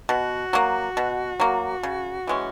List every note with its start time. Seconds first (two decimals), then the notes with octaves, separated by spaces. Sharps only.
0.09 B2 F#4
0.53 F#3 A#3
0.97 B2
1.40 F#3 A#3
1.83 C#3
2.27 E3 G#3 C#4